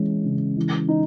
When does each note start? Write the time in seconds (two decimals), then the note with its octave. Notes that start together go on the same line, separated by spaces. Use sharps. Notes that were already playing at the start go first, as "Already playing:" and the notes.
Already playing: E3 G#3 C#4
0.24 C#3
0.57 E3
0.88 D#4